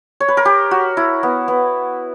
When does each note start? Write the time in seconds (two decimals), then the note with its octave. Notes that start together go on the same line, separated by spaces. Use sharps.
0.20 C#5
0.28 B4
0.37 A#4
0.45 G4
0.71 F#4
0.97 E4
1.23 B3
1.48 B3